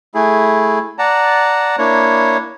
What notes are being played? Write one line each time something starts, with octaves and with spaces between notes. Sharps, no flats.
A3 E4 G#4
D5 F#5 A5 A#5
A#3 D4 E4 C#5